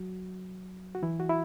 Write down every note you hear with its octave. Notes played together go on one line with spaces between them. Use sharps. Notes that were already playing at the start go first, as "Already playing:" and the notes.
Already playing: F#3 F#4
F#4
E3 E4
F#4
E4